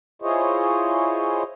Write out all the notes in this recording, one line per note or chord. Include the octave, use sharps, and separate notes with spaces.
E4 F4 G#4 C5 C#5 D#5